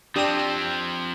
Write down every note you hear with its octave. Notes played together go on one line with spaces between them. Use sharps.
F3 C4 D4 G4 D#6